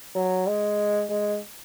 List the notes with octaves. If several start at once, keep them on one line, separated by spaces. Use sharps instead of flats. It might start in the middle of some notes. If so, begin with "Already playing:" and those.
F#3
G#3
G#3